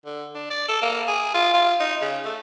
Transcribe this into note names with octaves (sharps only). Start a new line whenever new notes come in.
D3
D4
D5
A4
A#3
G#4
F4
F4
D#4
C#3
A3